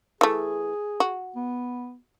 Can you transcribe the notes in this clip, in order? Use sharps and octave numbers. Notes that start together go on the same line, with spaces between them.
E3 A3 G#4
F#4
B3